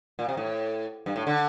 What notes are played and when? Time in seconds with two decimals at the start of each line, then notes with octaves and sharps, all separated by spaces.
0.19 A#2
0.29 C3
0.37 A2
1.06 G2
1.16 A2
1.27 D3